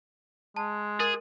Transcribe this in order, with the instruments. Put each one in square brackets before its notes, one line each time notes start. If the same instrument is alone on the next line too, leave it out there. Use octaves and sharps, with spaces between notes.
[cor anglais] G#3 [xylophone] A5
[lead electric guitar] G#4 [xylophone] A#4 A6